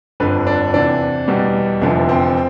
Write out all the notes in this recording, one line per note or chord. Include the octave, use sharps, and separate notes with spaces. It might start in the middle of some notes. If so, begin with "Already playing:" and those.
G1 F2 D3 B4
D4
E2 C3 E3 D4
E2 B2 G3
F1 E2 D3 F3 E4
C4